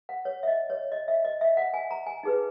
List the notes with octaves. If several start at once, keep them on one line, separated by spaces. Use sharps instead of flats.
F#5
C#5
E5
D#5
C#5
D#5
E5
D#5
E5
F#5
G#5
A#5
G#5
D#4 G#4 B4